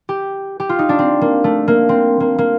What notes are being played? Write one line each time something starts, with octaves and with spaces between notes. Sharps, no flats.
G4
G4
F4
D#4
D4
C4
A#3
A3
A#3
C4
A#3
A#3